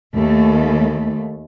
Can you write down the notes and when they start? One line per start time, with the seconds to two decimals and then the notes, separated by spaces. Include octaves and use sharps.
0.13 D#2 A3